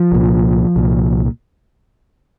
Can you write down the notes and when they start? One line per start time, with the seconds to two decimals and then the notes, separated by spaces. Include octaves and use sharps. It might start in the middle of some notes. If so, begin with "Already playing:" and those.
Already playing: F3
0.12 C2 A#2
0.76 C2 A#2